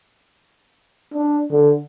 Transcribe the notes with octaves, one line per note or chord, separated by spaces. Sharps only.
D4
D3